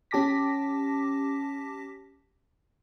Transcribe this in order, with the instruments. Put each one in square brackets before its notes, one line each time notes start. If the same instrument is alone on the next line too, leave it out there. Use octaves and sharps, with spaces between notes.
[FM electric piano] C#4 G4 A5 D6 A#6 B6